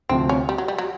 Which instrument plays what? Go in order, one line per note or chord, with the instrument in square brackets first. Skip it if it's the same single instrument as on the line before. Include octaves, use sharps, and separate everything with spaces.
[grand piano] D2 C3 F3 [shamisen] C4
[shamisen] C#4
G3
F#3
G3
F#3